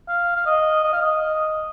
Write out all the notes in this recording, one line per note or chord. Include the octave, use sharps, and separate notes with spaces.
F5
F5
D#5
D#5
F5
D#5